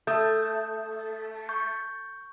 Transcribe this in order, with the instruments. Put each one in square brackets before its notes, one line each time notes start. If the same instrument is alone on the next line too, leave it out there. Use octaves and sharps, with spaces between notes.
[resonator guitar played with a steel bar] A3 [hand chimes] A4 D#6 G6
[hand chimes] C#6 G6